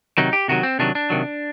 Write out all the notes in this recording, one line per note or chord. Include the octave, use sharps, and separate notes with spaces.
C3 D#3 F#3 D#4
G4
C3 D#3 F#3 F#4
C4
C3 D#3 F#3 D4
D4
C3 D#3 F#3